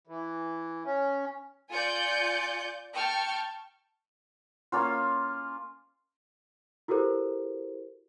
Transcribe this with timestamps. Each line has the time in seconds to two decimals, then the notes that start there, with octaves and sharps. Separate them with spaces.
0.07 E3
0.85 C#4
1.71 F4 D5 G#5 G6 C#7
2.96 G5 A5 C#6 F6
4.72 A#3 C#4 F4
6.88 E4 F#4 G4 A4 A#4 C5